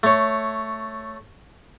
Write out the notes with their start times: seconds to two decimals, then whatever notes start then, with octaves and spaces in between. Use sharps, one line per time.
0.03 A3 C#5